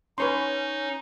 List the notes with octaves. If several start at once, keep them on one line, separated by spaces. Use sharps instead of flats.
C#4 D#4 B4 C#5 C6